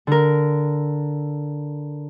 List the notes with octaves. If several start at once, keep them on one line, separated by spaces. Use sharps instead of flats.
D3 A#4